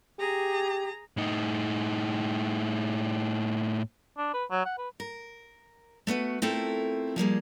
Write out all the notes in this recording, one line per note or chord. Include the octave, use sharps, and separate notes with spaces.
G4 G#4 A#5
A2 D#4
D4
B4
F#3
F#5
B4
A#4
A3 B3 F#4 B4
A3 C4 E4 F4 A4 A#4
F3 G3 A#3 G#4